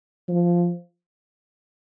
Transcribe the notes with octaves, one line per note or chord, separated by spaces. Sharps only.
F3